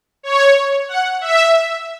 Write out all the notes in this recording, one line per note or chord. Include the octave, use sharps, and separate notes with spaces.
C#5
F#5
E5